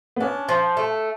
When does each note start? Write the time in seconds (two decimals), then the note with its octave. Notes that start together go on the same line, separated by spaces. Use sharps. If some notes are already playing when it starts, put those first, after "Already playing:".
0.16 B3
0.20 C#4 D4
0.49 F3
0.77 A3